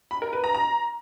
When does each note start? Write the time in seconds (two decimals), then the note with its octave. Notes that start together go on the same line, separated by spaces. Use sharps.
0.11 B5
0.22 A#4
0.33 B4
0.44 A#5
0.55 A#5